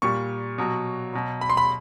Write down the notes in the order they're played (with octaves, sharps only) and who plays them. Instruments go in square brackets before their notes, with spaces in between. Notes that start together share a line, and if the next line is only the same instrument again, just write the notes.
[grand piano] A#2 G3 C#6
B2 F#3
B2 F#3
B5
C6
B5